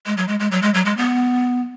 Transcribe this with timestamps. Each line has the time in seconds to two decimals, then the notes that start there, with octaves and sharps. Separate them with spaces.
0.06 G#3
0.17 F#3
0.28 G#3
0.40 G#3
0.51 F#3
0.62 G#3
0.74 F#3
0.85 G#3
0.97 B3